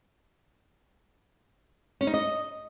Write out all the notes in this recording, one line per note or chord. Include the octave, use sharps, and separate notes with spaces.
C#4
D#4
D#5